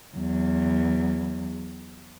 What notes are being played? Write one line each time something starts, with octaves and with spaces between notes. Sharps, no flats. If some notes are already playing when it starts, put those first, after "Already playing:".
E2 F#3